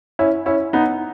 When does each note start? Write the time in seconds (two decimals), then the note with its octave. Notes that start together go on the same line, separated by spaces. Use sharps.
0.19 C#4 E4
0.46 C#4 E4
0.73 B3 D#4